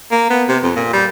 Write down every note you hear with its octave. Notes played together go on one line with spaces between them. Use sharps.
A#3
B3
C3
F2
A#2
G3